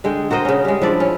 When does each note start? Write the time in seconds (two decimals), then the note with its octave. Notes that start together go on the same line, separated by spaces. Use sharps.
0.04 D3 G#3 G#4 G5
0.31 F#4 A#4 C5 D#5
0.45 C#3 C#4
0.65 G3 G#3
0.82 F3 D4 E4 D5
1.00 C#4